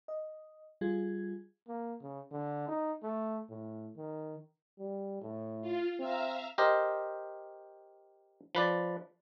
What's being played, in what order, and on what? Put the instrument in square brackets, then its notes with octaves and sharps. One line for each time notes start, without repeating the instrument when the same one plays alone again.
[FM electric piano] D#5
G3 F4 G#4 G#6
[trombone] A#3
C#3
D3
D#4
A3
A2
D#3
[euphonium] G3
A2
[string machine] F4
[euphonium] C4 [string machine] E5 F5 A#5
[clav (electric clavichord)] G4 A#4 C5 D#5
F3 B4 D5